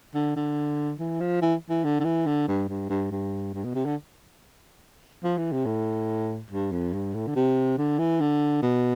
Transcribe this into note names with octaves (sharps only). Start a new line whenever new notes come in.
D3
D3
E3
F3
E3
E3
D3
D3
E3
D3
G2
G2
G2
G2
G2
B2
C3
D3
F3
E3
C3
A2
G2
F2
G2
A2
D3
C3
D3
E3
D3
B2